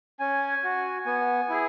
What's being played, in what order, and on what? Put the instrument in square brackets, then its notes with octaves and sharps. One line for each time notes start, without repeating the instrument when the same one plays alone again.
[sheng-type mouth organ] C#4 G#5
F#4
B3 G#5
E4 G#4